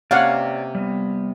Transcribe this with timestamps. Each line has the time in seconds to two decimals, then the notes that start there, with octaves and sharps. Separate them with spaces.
0.11 C3 A#3 C#4 C#5 D5 F5 F#5
0.75 G3 B3